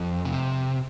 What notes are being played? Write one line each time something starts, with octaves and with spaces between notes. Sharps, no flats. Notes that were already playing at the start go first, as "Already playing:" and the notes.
Already playing: F2
C3